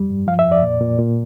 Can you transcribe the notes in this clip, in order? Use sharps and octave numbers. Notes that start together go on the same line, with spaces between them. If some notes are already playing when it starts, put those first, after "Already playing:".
Already playing: F2 G3
G2
F3 F5
E5
F2
D5
A#2
A#2
A#2